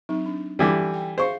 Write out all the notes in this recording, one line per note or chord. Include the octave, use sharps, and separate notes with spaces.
F#3 C4 D#4
D4
D3 E3 G3 C#4 G4 D6
G5
G#4 C5 F5 C#6